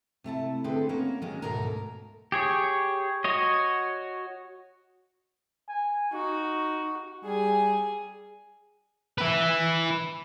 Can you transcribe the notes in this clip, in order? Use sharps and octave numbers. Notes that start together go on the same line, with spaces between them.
C3 A3 E4 A5
D3 C4 G#4 A4 B4
A#3 C#4 C#5 F#5
D#3 F#3 G#3 A#3 C#4
D2 G#2 B2 A4 A#4
G4 G#4 C#5
F#4 C#5 D#5
G#5
D#4 F#4
G3 G#4 G#5
E4 B4